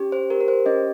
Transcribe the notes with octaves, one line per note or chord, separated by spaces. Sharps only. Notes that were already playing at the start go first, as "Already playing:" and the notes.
Already playing: C#4 G4
C5
G4 A#4
A#4
C5
C#4 D#5